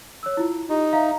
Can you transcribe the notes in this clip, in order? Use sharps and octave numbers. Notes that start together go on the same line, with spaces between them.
C#5 E6
E4 F4
D#4 G4
E5 F5 A#5